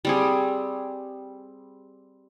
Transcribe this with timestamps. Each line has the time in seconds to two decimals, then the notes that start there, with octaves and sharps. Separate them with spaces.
0.05 G3 C4 G#4